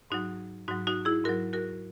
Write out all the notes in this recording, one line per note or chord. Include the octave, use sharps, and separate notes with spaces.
G#2 F#3 D#4 F#4
G#2 F#3 D#4 F#4
D#4 F#4
E4 G#4
G#2 F#3 F#4 A#4
F#4 A#4